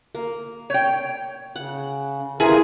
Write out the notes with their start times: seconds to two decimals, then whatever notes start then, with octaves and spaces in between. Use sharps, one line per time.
0.15 A#3
0.70 C#5 G5
1.56 C#3 F#5
2.40 C3 E3 F4 G#4 A#4